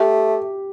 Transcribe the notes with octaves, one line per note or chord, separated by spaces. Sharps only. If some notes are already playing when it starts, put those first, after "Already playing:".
Already playing: A3 G4